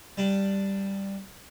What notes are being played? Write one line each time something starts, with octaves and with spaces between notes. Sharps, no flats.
G3 D4